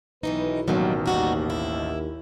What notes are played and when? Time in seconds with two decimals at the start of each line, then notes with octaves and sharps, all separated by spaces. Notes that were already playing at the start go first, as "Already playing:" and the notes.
0.23 B1 D#3 E3 D#4 B4
0.68 A1 B2 D#3 F#3 G3 A#3
1.06 D#2 G3 F#4 A#4
1.50 E4